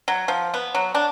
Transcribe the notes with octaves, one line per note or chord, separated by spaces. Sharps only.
F#3
F3
B3
F#3
D4